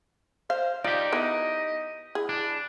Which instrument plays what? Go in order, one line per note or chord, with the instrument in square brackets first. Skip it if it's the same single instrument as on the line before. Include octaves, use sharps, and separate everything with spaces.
[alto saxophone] C5 [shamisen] F5
[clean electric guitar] D#4 G4 [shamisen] F4 [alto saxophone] D5
[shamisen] B3 E4 [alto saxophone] D#5
[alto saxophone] E4 [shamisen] G#4
[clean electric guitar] D4